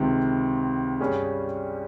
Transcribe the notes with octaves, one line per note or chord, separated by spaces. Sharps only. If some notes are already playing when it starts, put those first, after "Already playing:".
Already playing: C#2 C3 D#3
G2 G3 C#4 G#4